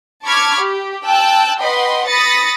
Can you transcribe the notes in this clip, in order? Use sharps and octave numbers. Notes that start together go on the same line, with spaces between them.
A5 B5 C#6 D6 F6 G#6
G4
G5 A5 E6 F#6
B4 D#5 F#5 G5 B5 C6
B5 D#6 A6 A#6 C#7